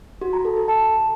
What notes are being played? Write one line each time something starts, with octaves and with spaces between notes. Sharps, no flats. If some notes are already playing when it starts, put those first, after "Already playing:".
F#4
A#5
A4
A4
A5